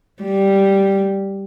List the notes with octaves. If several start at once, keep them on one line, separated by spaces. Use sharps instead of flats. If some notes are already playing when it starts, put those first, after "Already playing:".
G3